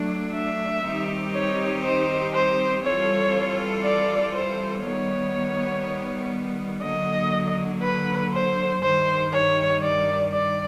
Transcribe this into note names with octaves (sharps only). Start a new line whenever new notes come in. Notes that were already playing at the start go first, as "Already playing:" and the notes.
Already playing: F#3 A3 D4
E5
D#3 G3 C4 D#4 G4
C#5
C5
C5
E3 G3 C4 F4 A4 C#5
D5
C5
D#3 G3 B3 C#5
D3 F#3 A#3 D#5
B4
C5
G2 D#3 G3 C5
C#5
D5
D5